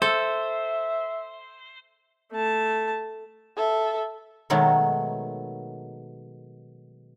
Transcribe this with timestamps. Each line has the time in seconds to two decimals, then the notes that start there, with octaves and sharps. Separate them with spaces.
0.02 A4 C5 E5
2.32 A3 A5
3.57 A4 E5
4.50 B2 D#3 F#3 G#3 A3